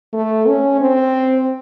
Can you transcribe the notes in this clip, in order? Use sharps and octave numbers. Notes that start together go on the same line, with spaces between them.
A3
C#4
C4